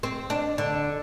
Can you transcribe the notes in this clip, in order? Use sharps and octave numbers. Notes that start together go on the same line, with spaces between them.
C4
D4
D3